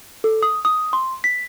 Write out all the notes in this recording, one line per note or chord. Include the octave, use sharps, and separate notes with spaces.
A4
D#6
D#6
C6
B6